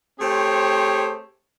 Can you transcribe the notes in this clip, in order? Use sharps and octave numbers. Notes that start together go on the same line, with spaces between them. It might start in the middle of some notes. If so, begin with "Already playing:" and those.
A3 C4 G4 G#4 C5 C#5